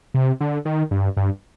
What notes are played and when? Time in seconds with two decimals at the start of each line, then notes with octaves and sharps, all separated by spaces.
0.14 C3
0.41 D3
0.65 D#3
0.91 G2
1.17 G2